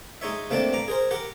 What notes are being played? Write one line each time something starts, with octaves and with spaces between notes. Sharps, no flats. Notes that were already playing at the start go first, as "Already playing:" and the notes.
G#3 D#4 C#5 E5
C3 A3 A#3 D4 G5 A5
G2 A#5 D6
G#4 A#4 C5
G4 A#4 F#5